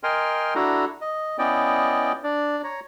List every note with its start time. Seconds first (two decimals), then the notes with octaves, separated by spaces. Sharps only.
0.03 A#4 D#5 G5 G#5 C6 F6
0.55 D4 E4 F#4 A4 A#5
1.01 D#5
1.39 B3 C#4 E4 D5 D#5 G5
2.24 D4 D5
2.64 C#5 A#5